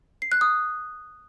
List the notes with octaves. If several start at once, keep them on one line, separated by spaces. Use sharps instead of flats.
C7
F#6
D#6